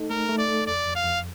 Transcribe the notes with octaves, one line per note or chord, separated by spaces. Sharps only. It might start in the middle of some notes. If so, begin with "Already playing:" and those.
Already playing: A3 D#4 A4
A3 A#4
A3
D5
A4
F2 D5
F2
F5
F2